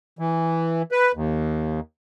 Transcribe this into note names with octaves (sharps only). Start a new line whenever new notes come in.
E3
B4
D#2